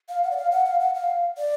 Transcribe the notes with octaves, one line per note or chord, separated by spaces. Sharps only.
F5
F#5
D5
F5
F#5
F5
F#5
F5
D5